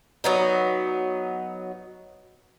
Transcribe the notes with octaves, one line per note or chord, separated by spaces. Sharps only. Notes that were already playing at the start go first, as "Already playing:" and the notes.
F#3 B3 D#4